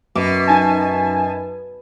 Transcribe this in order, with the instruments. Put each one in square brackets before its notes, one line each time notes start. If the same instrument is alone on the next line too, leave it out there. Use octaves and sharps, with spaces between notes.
[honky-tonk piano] F#2 [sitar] B2 [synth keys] D6
[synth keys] D#4 G#5 A5